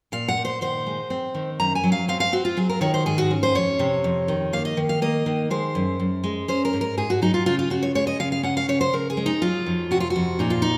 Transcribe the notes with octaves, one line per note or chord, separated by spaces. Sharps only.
A#2 F5
F#5
A#2
C5
D#3 C5
G#3
C4
D#3
F#2 A#5
G#5
F#3
F5
C4 F5
F5
C4 F#4
F4
F#3 G#4
A#4
D#3 C#5
C5
G#2 G#4
F#4
C#4
C5
F2 C#5
C3
F2
D#3
A#3 F5
D#5
D#3
F5
A#3 D#5
D#3
G#3 C5
F#2
F#2
G#3
C#4 C5
A#4
G#2
A#4
G#2 G#4
F#4
F#3 D#4
F4
C#3 F4
F4
C#3 F#4
C#5
G#3 C#5
D#5
C#3 F5
F5
C#4 F#5
F5
C#3 C#5
C5
C#3 A#4
G#4
G#3
D#4
F#3 F4
F2
C3 F#4
F4
F#4
F2
A#2 D#4
F4
D#4